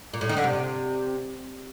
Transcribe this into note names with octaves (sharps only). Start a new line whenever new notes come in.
A#2
A2
D#3
D3
C3